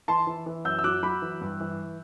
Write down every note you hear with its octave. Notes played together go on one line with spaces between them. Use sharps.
E3 A5 C6
E3
E3
F#2 E6 G6
E6
F#3 D6 F#6
F#3 B5 D6
E3
G2
E3